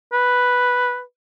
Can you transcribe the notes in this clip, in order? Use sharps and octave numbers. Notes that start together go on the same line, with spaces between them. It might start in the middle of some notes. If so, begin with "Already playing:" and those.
B4